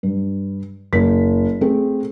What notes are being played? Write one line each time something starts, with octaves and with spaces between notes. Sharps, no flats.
G2
F#1 B6
A3 C4 G#4